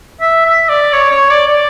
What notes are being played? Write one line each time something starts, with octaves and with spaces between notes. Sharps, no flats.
E5
E5
D5
C#5
C#5
D5
D5